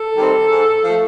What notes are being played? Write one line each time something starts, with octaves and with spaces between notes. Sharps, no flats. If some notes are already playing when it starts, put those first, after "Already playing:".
Already playing: A4
D#3 G3 C4 D#4
G#2
F3 A3